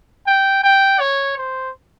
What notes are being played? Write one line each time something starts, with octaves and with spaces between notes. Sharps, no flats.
G5
G5
C#5
C5